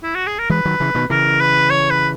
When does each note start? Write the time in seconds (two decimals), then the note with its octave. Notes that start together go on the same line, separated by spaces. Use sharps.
0.03 E4
0.15 F#4
0.26 G#4
0.38 A#4
0.50 E3 G#3 B4
0.65 D#3 F#3
0.80 C#3 E3
0.95 B2 D#3
1.10 C#3 E3 A#4
1.40 B4
1.70 C#5
1.90 B4